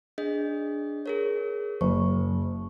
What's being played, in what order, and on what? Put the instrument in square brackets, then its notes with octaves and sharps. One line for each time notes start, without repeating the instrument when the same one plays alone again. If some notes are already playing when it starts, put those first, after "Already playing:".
[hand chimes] D4 G#4 D#5
G#4 A#4 C#5
[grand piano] F#1 [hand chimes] C#6